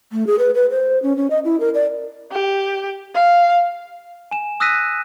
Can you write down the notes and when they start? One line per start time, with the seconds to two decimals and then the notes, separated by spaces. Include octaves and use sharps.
0.12 A3
0.27 G#4
0.39 B4
0.54 B4
0.70 C5
1.03 C#4
1.17 C#4
1.30 D#5
1.45 E4
1.60 A#4
1.74 D5
2.31 G4
3.14 F5
4.31 G#5 E7
4.60 D#6 E6 F#6 A#6 B6 D#7